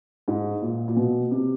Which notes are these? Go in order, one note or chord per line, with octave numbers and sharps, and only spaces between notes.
G#2
A#2
A#2
B2
C3